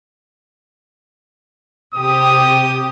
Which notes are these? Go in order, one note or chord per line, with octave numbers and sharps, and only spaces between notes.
C3 G4 D#6